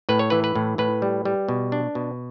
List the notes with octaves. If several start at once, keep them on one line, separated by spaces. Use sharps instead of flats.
A2 B4
C#5
E3 B4
B4
A2
A2 B4
G3
G3
B2
D4
B2